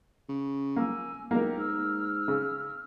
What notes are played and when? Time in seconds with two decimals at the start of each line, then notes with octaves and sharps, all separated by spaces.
0.29 C#3
0.76 A#3 G#5 E6
1.31 B1 A#3 G4 A4 A#4 D#5
1.57 G#2 E6 F6
2.28 C#3